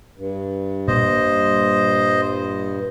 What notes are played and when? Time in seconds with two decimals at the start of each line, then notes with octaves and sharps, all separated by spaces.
0.17 G2
0.88 A#2 G3 C5 D#5